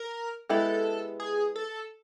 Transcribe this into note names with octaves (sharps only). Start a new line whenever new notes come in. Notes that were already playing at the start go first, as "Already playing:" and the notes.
Already playing: A#4
G#3 B3 E4 G4 A4
G#4
A4